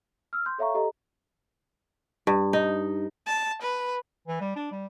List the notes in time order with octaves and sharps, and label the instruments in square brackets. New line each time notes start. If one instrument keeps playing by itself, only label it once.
[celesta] E6 F6
C6 G6
A4 C#5 E5 F5 A#5 C#6
G4 A4 D#5 A#5
[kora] G2
D#4
[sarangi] A5
B4
[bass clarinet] E3
G3
D4
G3